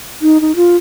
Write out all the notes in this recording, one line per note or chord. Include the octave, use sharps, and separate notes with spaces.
D#4
D#4
F4